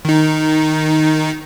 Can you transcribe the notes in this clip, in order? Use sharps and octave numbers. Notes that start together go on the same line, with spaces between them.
D#3 D#4